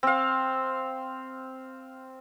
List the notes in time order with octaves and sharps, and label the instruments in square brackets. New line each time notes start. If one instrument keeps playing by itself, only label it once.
[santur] C4 F5